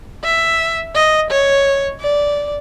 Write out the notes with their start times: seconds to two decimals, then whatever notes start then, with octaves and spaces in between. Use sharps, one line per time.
0.24 E5
0.95 D#5
1.31 C#5
2.01 D5